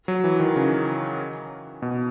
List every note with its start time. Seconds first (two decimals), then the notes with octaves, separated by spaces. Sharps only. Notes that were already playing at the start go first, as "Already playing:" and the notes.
0.08 F#3
0.24 E3
0.40 D#3
0.56 C#3
1.82 B2